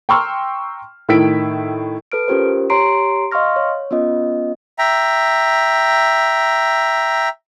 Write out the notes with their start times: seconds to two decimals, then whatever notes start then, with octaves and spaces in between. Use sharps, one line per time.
0.09 G5 A#5 C6 C#6 E6 F6
1.09 A2 D#3 E6 B6 D7
2.12 A4 B4 F6 D7
2.28 C#4 F4 G4 A#4 C5
2.70 G4 C#5 A#5 C6 C7 D7
3.31 D#5 F5 C6 C#6 F6 A#6
3.56 C#5
3.91 B3 C#4 F4 D#5
4.79 E5 G5 A#5